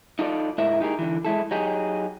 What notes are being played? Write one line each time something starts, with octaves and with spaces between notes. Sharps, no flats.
D#4 F4 A4 D5
G#2 E4 A#4 E5
D#4 G4 G#4 A#4
D3 E3
G#3 E4 A4
F#3 D#4 G4 G#4